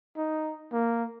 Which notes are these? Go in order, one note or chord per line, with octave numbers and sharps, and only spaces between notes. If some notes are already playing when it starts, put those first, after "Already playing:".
D#4
A#3